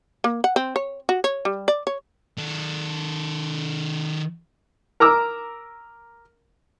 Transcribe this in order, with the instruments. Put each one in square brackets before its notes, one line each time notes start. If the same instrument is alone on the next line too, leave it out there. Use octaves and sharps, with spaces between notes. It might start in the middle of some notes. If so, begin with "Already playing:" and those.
[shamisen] A#3
F#5
C4
C#5
F#4
C#5
G3
D5
C#5
[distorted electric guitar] D#3 A4
[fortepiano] A#4 A#5 D6 E6